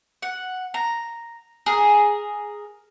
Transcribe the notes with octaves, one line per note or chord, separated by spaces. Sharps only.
F#5
A#5
G#4 A#4